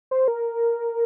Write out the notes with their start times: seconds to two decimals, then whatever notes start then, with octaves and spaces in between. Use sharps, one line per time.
0.11 C5
0.28 A#4